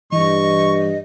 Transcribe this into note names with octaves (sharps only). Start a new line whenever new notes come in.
G2 E3 D#5 C#6